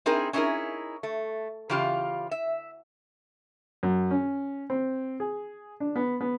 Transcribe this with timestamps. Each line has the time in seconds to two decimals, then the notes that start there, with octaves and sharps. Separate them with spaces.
0.06 C4 D#4 E4 G#4 A#4
0.33 C#4 D#4 E4 G4 G#4 A#4
1.03 A3
1.70 C#3 E3 F4 G4 F5
2.31 E5
3.83 F#2
4.11 C#4
4.70 C4
5.20 G#4
5.80 D4
5.96 B3
6.21 B3